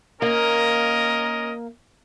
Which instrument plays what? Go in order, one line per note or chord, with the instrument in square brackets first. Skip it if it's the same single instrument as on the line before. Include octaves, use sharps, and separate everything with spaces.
[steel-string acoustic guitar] A#3 [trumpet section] C#4 A#4 D#5